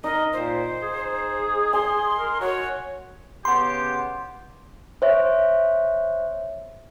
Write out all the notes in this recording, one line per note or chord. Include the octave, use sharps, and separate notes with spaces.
D#4 A#4 D#5
A#2 C5
G#4
G#5 C6
A#4
F#4 C#5
C#3 B3 G4 C6
C5 C#5 E5